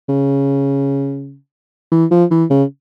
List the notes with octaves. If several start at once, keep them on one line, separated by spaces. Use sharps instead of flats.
C#3
E3
F3
E3
C#3